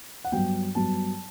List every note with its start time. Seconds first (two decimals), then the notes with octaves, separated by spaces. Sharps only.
0.25 F#5
0.32 G2 F#3 B3 G5
0.75 G2 F#3 B3 A5